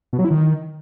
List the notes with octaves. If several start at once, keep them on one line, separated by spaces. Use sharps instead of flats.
B2
F#3
E4
D#3